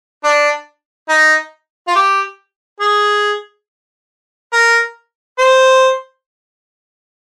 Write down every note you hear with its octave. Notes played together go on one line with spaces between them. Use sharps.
D4
D#4
F4
G4
G#4
A#4
C5